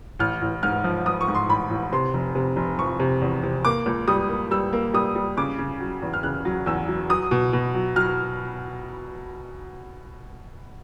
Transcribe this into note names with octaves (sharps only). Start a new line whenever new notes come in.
A1 F6
A1
G#2 F6
F3
F3 D#6
C#6
G#2
C6
A1 B5
A1
C3 C6
F1
C3
F1
F3 C#6
C3
E2
C3
A#3 D6
C#2
G3 D#6
A#3
G3 E6
A#3
G3 D#6
G3
C#3 D6
C#3
F#3
E2
F6
C#3 F#6
F#3
E2 E6
F#3
F#3 D#6
B2
B2
F#3
F#3 F6